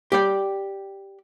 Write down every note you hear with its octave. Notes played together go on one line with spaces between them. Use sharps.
G4 D5 G5